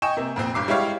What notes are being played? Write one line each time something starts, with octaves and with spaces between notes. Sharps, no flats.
D#5 G5 G#5 C#6 E7
C3 A#3
F2 A#2 C4
G1 G2 D6 C7
G3 G#3 E4 G4 C#5 F5